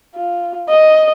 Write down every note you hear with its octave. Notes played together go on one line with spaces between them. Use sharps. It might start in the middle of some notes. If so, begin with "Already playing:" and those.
F4
D#5